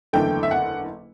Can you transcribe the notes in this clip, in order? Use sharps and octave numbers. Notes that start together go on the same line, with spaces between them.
F#1 E2 D3 A3 G5
E5
F#5